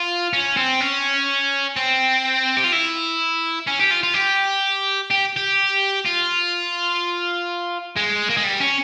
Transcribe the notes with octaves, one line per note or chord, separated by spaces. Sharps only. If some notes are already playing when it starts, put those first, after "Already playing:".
Already playing: F4
C#4
C4
C#4
C4
G4
F4
E4
C#4
G4
F4
F4
G4
G4
G4
F4
G#3
A#3
G#3
G3
C#4